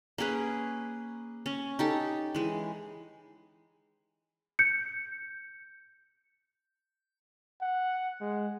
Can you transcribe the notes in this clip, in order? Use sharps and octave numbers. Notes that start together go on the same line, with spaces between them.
A#3 C#4 G#4 B4
C#4
D#4 G4 A4
E3 G#3
G6 C#7
F#5
G#3